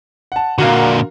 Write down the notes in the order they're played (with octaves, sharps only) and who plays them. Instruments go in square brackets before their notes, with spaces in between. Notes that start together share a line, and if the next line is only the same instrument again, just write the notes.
[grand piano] F#5 A5
[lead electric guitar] A#2 D3 [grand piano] F#4 A#4 F5